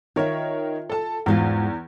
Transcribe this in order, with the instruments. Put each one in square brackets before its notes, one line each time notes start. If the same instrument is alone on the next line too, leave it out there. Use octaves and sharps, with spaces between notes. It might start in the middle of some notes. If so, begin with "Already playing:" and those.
[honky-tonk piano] D#3 A#4 C#5 [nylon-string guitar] F4 E5
[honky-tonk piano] A4 A5
[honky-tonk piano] E2 [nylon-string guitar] G#2 G#3 F4